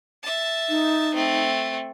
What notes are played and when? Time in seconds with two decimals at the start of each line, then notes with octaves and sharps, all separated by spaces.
0.23 E5 A5
0.69 D#4
1.14 A3 C4